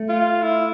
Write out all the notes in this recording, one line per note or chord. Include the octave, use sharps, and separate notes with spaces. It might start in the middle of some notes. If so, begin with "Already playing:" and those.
Already playing: A3
F4
E4